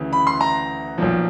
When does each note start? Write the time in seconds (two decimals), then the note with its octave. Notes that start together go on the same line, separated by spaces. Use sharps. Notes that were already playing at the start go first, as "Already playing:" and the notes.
Already playing: D2 C#3 E3
0.13 B5
0.27 C6
0.41 A#5
0.98 B1 A#2 F3